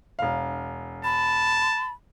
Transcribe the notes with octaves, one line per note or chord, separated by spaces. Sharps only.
E1 F5
A5 B5